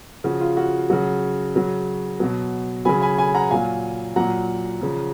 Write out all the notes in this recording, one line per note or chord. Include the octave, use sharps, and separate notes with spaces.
C#3 F3 F#4
F4
F#4
C#3 F#3 F#4
C#3 F#3
B2 F#3
C#3 F#3 G#5 B5
G#5 B5
G#5 B5
F#5 A#5
A#2 F#3 F5 G#5
A#2 F#3 F#5 A#5
C#3 F3